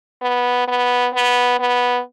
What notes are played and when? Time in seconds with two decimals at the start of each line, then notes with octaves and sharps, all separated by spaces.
0.22 B3
0.68 B3
1.14 B3
1.60 B3